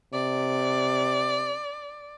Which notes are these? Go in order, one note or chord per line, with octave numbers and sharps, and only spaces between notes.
C3 D5